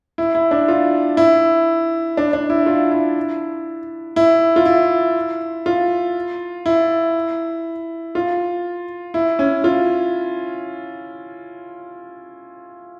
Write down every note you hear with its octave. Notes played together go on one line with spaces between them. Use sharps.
E4
E4
D4
F4
E4
D4
D4
E4
F4
E4
E4
F4
E4
F4
E4
F4
E4
C#4
F4